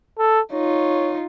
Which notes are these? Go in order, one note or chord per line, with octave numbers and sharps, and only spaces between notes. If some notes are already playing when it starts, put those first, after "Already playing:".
A4
D#4 F4 C#5